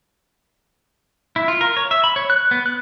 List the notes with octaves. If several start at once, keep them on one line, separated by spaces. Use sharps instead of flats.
E4
F4
A#4
C#5
E5
B5
C#5
F#6
B3
F#6